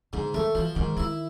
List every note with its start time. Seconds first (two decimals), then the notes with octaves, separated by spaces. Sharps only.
0.13 G#2 D3
0.34 D#3 A3
0.55 E3 F3
0.75 G#2 D#3
0.97 D#3 E4